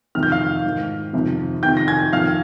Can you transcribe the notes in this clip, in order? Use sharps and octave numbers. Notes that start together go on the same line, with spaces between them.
F2 C3 D#3 F6
G6
F5 F6
G#2 D#3
F2 C3 D#3
F2 C3 D#3 G5 G6
A#6
G#5 G#6
F2 D#3 F5 F6